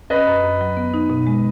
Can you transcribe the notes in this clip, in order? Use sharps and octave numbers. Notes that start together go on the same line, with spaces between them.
C#4 B4 D#5
F#2
F#2
F#3
B3
D#4
B2
G#3